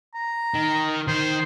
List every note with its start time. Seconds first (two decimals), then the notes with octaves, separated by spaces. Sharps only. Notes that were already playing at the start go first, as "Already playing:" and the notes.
0.14 A#5
0.54 D#3
1.08 D#3 C5